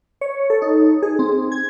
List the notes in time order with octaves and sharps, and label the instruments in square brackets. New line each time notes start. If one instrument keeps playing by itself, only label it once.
[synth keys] C#5
A4
D#4
G#4
C4
G#6